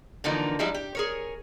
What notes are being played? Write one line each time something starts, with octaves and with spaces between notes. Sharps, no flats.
D3 E3 F3 A#3 D#4
F3 G3 G#3 D#4 E4
G4
G#4 A#4 C#5